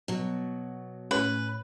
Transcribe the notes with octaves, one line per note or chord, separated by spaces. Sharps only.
B2 F#3
A2 C#4 B4